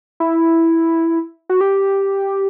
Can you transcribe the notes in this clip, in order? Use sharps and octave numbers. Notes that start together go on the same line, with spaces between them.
E4
F#4
G4